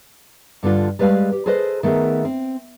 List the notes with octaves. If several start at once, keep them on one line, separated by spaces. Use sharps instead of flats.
G2 D3 D4 F4
G3 G#3 B4 D5 F5
G4
G#4 A4 B4 C5 D#5
D#3 A3 B3 G#4 A#4
C4